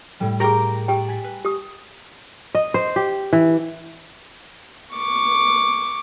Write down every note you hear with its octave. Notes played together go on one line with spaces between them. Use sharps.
A2 G3
G4 G#4 A#4 G5 A#5
G4 D5 G5
G#5 B6
B4
G4 D#6
D#5
C5
G4
E3
C#6 D6